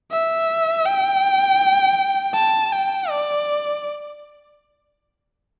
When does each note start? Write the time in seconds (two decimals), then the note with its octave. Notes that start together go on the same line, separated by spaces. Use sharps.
0.12 E5
0.86 G5
2.35 A5
2.72 G5
3.09 D5